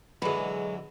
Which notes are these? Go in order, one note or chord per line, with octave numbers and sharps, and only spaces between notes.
B2 D3 E3 F#3 G#3 G#4 B5